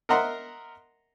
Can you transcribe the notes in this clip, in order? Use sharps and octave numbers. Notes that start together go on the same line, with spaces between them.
A#4 D#5 E5 F#5 A#5 C6